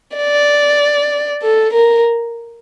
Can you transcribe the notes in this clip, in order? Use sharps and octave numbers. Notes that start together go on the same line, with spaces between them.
D5
A4
A#4